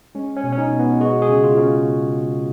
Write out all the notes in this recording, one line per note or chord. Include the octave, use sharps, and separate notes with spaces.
G#3 C#4
C#4
B2
C#4
D#4
B2
B3
G#3 F#4
G#4
C#3
F4
C#3